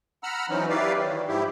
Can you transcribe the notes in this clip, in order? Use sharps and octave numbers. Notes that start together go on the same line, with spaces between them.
F#5 A#5 B5 E6 F6
E3 F#3 C4 C#4 D#4
E4 G4 B4 D5 F5
D#3 E3 F#3
G#2 F3 E4 G4